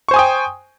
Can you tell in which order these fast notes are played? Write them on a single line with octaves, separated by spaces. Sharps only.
C#6 C5 G#5 D#6 G5